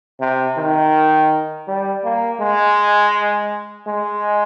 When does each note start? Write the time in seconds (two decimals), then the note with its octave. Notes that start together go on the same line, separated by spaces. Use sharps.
0.21 C3
0.58 D#3
1.68 G3
2.04 A#3
2.40 G#3
3.87 G#3